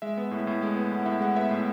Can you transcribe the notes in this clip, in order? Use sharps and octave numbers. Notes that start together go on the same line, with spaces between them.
G#3 E5
B3
A2
A2
G#3
B3
A2 F#5
A2 E5
G#3 F#5
B3 E5
A2